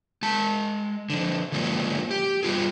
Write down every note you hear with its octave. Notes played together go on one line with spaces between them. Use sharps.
G#3 A5
D3 F3
D3 F3 F#3 G#3 A#3 C#4
G4
G3 B3 F4 G#4